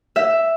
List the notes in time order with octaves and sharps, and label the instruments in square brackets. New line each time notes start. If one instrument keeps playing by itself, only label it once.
[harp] E5